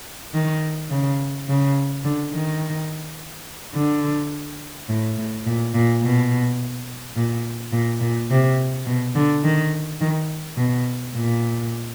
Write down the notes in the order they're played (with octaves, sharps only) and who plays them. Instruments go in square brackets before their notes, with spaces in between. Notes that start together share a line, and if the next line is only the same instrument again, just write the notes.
[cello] D#3
C#3
C#3
D3
D#3
D3
A2
A2
A#2
A#2
B2
A#2
A#2
A#2
C3
B2
D3
D#3
D#3
B2
A#2